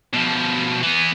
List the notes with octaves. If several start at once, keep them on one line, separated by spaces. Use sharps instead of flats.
B2 F3
E3 B3